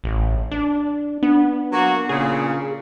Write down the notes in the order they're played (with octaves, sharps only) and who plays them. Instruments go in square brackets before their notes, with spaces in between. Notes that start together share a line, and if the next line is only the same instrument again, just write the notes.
[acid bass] A1
D4
[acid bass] B3 [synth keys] D4
[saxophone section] F#3 A#3 F#4
[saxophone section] A#2 C#3 [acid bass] G#4